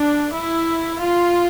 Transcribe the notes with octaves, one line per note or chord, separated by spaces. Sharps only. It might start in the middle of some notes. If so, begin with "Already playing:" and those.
Already playing: D4
E4
F4